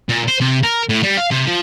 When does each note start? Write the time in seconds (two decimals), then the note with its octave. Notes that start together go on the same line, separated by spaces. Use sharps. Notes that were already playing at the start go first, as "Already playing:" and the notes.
0.09 A#2
0.28 C5
0.41 C3
0.63 A#4
0.89 A2
1.03 G3
1.17 F5
1.31 C3
1.46 F3